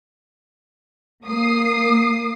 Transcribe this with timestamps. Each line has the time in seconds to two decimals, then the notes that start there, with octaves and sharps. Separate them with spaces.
1.25 A#3 D#6 C7